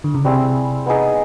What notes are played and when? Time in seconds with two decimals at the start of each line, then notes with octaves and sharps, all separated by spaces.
0.04 D3
0.15 C#3
0.25 C3 G3 C4 E4 G#4
0.86 B3 D#4 G#4